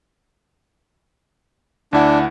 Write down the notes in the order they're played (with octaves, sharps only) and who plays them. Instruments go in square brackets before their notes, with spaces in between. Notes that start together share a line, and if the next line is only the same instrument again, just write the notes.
[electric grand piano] D2 E4 F#5 [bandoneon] D4